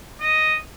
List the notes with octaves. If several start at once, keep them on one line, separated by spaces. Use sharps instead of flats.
D#5